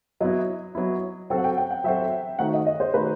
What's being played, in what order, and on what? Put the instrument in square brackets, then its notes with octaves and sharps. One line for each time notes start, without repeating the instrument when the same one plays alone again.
[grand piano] F#3 B3 E4 [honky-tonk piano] D#5
[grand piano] F#3 B3 E4
[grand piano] F#3 C4 F#4 A4 C5 [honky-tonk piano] G5
[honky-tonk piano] F#5
G5
G5
F#5
[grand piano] F#3 C4 F#4 A4 C5 [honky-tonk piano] E5
[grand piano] D#3 A3 D#4 F#4 C5 [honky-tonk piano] F#5
[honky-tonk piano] D#5
D#5
C5
[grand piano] D#3 A3 D#4 F#4 C5 [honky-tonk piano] B4